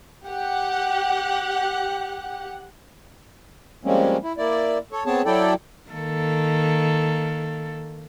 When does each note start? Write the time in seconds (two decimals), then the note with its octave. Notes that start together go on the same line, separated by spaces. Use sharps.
0.25 G4 F#5
3.85 F3 G3 G#3 A#3 C4 C#4
4.23 E4
4.38 A#3 E4 D5
4.92 A4 C#5
5.06 B3 C4 G#4 C#5 A5
5.26 F#3 E4 A4 D5 G5
5.90 D#3 A#3 A4